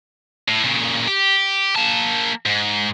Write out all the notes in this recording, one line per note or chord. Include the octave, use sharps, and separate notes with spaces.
A2
A#2 C#3
G4
A#3 A5
G#2